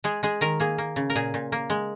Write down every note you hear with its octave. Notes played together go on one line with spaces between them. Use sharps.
G#3 G#4
G#3 G#4
D#3 A#4
A#3 G#4
A#3
C#3
A#4
A#2 G#4
A#2
A#3
G#3